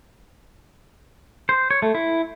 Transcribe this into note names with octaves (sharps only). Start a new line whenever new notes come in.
C5
C#5
A3
E4